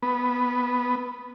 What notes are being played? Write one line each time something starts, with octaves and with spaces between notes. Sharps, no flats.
B3